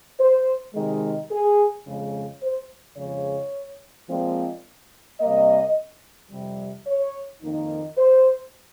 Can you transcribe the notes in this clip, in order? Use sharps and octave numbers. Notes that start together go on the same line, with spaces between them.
C5
C3 D#3 G#3
G#4
F2 C#3 G#3
C5
F2 C#3 F3 G#3 C#5
A#2 F3 G#3 C4
C3 G3 A#3 D#5
F2 C3 G3
C#5
F2 D#3 A#3 D#4
C5